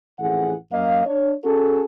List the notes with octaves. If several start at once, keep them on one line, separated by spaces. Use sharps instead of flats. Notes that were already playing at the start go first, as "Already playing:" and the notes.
A1 F2 E3 G#4 F#5
F#2 A#3 D#5 F5
D4 C#5
C#4 F#4 G#4 A4